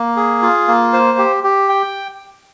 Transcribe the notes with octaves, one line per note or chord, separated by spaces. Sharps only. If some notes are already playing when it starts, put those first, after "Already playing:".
Already playing: A#3
G#4
F4
A#3
C5
G4
G4
G5